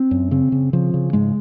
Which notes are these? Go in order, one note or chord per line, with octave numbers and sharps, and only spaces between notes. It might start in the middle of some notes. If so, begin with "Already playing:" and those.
Already playing: C4
F#2
C#3 C4
C#3
C#3 F3
C#3
G#2 G#3